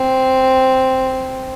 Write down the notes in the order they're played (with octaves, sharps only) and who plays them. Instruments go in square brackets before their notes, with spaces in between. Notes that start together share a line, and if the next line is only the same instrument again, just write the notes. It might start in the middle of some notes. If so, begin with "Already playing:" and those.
Already playing: [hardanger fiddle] C4